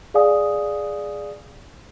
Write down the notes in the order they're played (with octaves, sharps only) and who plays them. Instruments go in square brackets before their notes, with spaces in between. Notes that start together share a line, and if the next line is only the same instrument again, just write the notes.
[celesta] G#4 D5 F5 G#5 D#6